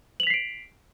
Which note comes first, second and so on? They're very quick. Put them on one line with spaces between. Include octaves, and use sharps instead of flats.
F#7 F7 B6 C7 D7